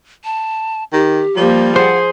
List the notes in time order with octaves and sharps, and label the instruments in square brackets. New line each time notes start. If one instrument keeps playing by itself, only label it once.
[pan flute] A5
[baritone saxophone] D#3 [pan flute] G4
[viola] F3 A#3 [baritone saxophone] G3
[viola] G#4 [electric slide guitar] C5 [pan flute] F#5